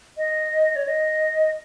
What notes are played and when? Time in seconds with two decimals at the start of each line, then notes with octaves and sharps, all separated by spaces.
0.17 D#5
0.76 C#5
0.87 D#5